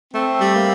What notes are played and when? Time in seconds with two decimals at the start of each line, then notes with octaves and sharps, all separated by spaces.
0.14 A3 C4
0.41 G3
0.55 A#3